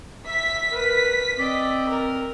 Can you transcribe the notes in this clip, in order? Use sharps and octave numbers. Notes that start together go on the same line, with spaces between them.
E5 B6
A#4 B4
C4 D5 D#5
A#4